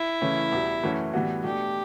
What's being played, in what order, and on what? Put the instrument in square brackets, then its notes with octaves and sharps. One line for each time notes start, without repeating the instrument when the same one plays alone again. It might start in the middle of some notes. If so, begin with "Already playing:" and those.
Already playing: [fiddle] E4
[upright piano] C#3 E3 A3 C#4
E2 B2 G3
F#2 E3 A3 C#4 F#4
A2 E3 G3 B3 F#4
[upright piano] B2 A3 D4 [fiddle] G4